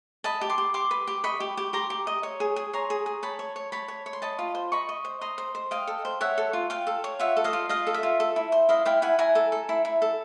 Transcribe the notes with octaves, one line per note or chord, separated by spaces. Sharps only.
D#5 A5 B5
G4
C6 D6
G4
G4 C6 D6
B4
G4
D#5 B5 C#6
G4
G4
G4 A#5 C6
G4
D#5
C#5
G#4
G#4
C#5 A#5 C6
G#4
G#4
C#5 A5 B5
C#5
C#5
C#5 A5 B5
C#5
C#5
C6
D#5 A5 B5
F4
C5
D#5 B5 C#6
D#5
C5
D#5 A#5 C6
C5
C5
D#5 F5 G5
A4
C5
C#5 E5 F#5
A4
F4
F4 F5 G5
A4
C#5
F4 E5 F#5
A4
D#5 F5
F4
F4 D#5 F5
A4
E5
F4
A4
E4
C5
E4 D#5 F5
E4 F5 G5
E4 F#5 G#5
E4 G#5 A#5
A4
A4
E4
E4
A4